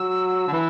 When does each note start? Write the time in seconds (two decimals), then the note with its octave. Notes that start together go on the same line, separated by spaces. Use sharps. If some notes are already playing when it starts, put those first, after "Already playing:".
Already playing: F#3 E6
0.48 D3
0.53 E3